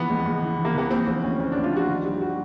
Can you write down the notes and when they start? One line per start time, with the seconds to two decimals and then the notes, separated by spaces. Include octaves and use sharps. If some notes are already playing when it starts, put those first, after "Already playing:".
Already playing: E3 F3 B3
0.09 C#2
0.26 C#2
0.42 E3
0.58 E3
0.65 A#3
0.75 E3 B3
0.91 F3 C4
1.07 D2 C4
1.23 D2 C#4
1.39 D2 C#4
1.52 D4
1.56 D2
1.64 F4
1.72 F3 F#4
1.89 D#3
2.04 G2 G4
2.21 F#4